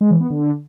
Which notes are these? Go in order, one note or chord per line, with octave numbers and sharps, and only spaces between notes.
G#3
E3
B3
D3